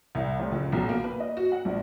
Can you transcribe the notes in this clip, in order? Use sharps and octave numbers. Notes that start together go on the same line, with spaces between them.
C2
F1
C#2
B1
A#3
B4
D#5
F#4
F#5
A#1